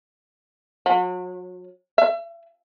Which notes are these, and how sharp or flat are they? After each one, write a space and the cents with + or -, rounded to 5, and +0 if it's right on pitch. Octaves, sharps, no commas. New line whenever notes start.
F#3 -35
E5 +40